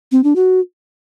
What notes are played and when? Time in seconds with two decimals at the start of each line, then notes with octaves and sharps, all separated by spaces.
0.12 C4
0.24 D4
0.36 F#4